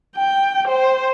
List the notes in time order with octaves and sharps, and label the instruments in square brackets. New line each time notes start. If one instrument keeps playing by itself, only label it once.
[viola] G5
C5